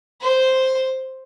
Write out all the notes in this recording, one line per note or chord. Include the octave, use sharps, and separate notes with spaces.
C5